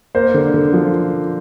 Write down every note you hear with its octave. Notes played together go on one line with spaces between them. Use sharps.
A#3 C5
D3
D3
F3